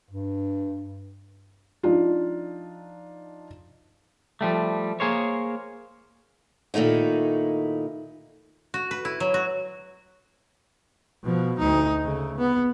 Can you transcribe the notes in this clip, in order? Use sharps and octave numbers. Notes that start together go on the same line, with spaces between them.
G2
F3 D4 D#4 F4
F3 G3 A3
A#3 G#4 A#4 C5 C#5
A#2 D#3 A3 D#4 E4
F#4
B4
E4
F#3
F#4
B2 F3
D2 D#4
C#3 A3
B3